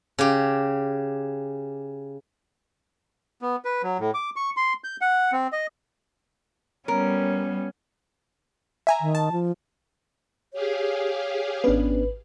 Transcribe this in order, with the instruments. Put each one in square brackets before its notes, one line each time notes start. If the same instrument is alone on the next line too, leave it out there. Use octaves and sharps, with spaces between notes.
[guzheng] C#3 G4
[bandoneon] B3
B4
F#3
A2
D6
C#6
C6
G6
F#5
C4
D#5
[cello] G3 B3 [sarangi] C#4 [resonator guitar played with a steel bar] A#4
[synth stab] E5 G#5 A#5
[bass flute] D#3
[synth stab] A5
[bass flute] F3
[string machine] G4 G#4 F5 [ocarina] C#5
[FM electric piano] G#1 B4 [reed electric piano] B3 C#4 D4